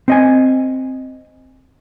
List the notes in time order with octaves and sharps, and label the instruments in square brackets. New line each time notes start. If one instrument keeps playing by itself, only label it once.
[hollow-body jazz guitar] C4 D#5 G#5